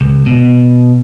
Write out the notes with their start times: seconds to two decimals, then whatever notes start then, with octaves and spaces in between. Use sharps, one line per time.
0.01 C#2
0.26 B2